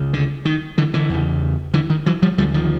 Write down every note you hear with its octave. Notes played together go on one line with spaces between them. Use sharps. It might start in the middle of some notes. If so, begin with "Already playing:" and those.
Already playing: C#2 C#3
D3
D#3
D3 E3
D3 E3
E2 C#3
D3 E3
D#3
E3 F#3
F3 G3
D2 D3 F3 G3
D#3 F3